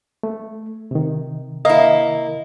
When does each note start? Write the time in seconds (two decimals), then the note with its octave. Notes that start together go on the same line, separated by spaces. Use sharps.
0.23 A3
0.91 C3 D#3
1.65 A#3 E4 D#5